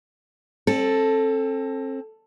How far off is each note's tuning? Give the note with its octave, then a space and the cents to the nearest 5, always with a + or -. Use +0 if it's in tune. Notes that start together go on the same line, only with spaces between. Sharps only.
C4 +35 A4 +0